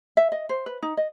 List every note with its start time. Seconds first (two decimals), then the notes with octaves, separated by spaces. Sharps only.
0.17 E5
0.32 D#5
0.49 C5
0.66 B4
0.82 D#4
0.97 D#5